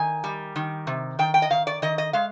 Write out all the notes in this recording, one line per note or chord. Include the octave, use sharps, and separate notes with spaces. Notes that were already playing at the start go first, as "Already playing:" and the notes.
Already playing: D#3 G#5
G3
D#3
C3
D#3 G5
G5
D#5
D#3 F5
D5
D#3 D#5
D#5
G#3 F5